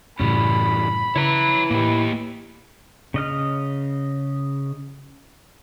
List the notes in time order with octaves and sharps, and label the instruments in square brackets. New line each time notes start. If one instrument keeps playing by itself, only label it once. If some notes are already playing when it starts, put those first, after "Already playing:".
[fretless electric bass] F#2 A2 C#3 [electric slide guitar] E3 G3 C#4 [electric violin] B5
[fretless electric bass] C#3 [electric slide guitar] E4 B4 [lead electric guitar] C#5 A#5
[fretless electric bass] A2 [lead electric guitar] A#3 G4
[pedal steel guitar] C#3 D#5 F6